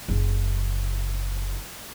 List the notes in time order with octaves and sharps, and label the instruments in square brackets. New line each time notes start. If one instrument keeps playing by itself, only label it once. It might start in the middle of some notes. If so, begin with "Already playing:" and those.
[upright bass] F#1 C#3